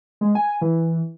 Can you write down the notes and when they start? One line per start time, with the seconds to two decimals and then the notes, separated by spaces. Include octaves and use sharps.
0.21 G#3
0.35 G#5
0.61 E3